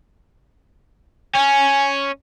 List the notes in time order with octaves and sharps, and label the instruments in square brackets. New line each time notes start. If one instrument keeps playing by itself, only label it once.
[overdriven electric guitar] C#4 [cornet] G#5